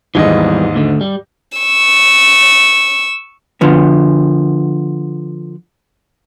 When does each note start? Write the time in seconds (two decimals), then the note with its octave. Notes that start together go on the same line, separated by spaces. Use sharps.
0.15 D#2 G#2 E3 G3 B3 D#5
0.75 D2 D3
1.01 G3
1.58 C#6 E6
3.61 D3 F3 B3